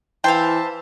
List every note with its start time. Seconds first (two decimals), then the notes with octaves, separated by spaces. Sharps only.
0.24 E3 C5 E5 F5 G5 A5